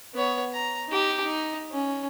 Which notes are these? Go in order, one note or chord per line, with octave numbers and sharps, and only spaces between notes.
B3 C#5
A#5
D#4 G4
D#4
C#4